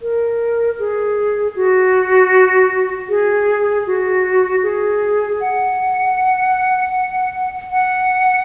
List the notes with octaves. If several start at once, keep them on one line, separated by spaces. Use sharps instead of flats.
A#4
G#4
F#4
G#4
F#4
G#4
F#5
F#5